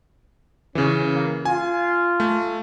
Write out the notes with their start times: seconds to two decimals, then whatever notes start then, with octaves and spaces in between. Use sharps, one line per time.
0.75 C#3 E3 C#4
1.13 A#3
1.45 F4 G#5
2.20 A3